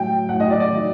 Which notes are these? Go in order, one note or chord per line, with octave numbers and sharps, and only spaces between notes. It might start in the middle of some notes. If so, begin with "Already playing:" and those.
Already playing: A2 F#3 G5
A2 F#3 F#5
D#5
D5
D5
D#3 F#3